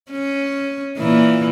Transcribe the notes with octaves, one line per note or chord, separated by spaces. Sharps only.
C#4
A#2 E3